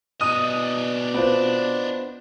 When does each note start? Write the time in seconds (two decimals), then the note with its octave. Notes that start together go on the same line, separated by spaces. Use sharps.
0.21 B2 D4 D#5 D#6
1.14 B3 C4 F4